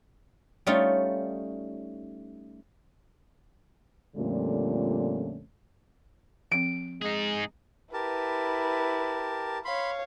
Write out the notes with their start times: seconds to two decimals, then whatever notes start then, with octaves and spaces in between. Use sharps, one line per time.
0.67 G3 A3 C#4 D#4 F4
4.16 F2 A#2 D3 G3 A3 C#4
6.52 F3 C4 D7
7.02 G#3 D#4 G#4
7.93 E4 G4 A#4 B4 A5
9.65 C#5 F5 B5 C6